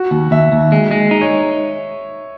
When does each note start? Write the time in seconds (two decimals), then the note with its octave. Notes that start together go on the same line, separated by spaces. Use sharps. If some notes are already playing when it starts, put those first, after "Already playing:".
Already playing: F#4
0.11 D#2
0.31 D#2 E5
0.52 D#2
0.72 G#3
0.91 G#3
1.11 D#4
1.21 C#5